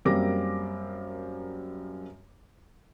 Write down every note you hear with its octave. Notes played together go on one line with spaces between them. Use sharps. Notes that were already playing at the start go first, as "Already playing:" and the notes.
F#2 G3 A#3 C4 D6 A#6